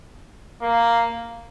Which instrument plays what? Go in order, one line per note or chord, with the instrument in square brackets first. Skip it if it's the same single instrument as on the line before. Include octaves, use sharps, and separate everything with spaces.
[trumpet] A#3